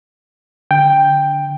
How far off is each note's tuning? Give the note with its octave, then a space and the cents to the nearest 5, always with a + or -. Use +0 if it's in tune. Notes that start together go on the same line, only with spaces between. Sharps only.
D3 -5 G5 +5